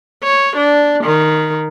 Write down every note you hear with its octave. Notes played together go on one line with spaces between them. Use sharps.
C#5
D4
D#3